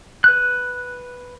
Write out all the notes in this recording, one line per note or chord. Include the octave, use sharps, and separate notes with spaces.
B4 F#6